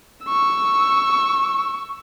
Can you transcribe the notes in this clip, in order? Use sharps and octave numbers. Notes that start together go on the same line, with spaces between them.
C#6 E6